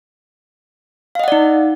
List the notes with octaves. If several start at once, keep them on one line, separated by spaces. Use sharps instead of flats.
D#4 D5 D#5 F5 F#5